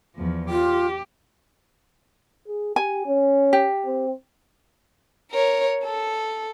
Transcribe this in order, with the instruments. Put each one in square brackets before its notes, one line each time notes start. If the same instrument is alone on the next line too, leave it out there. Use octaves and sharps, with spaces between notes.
[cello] E2 F3
[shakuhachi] F4 [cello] G4
[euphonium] G#4
[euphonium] G4 [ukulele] G#5
[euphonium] C#4
[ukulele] G4
[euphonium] C4
[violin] A#4 C#5
A4